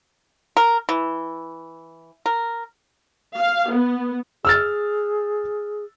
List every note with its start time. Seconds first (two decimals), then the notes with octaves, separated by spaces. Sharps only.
0.57 A#4
0.89 E3
2.26 A#4
3.37 F5
3.71 B3
4.45 G#4 E6 F6 A6